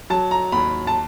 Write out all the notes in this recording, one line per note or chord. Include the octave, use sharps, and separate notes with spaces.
F#3 A5
A#5
D#2 B5
A5